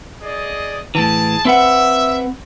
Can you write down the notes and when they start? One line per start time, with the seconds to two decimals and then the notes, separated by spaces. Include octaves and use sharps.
0.22 G#4 D5 D#5
0.95 A2 E3 G#4 A5
1.45 C4 B4 E5 F#5